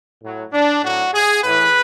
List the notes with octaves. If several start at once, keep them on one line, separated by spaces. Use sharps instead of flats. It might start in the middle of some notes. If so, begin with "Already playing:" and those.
A2 F#3
D4
A2 F#3 F#4
G#4
A2 E3 B4